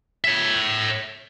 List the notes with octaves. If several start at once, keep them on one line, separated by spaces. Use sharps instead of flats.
C#5 E5